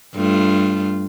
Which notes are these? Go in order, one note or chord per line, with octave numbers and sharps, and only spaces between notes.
G2 A3 F4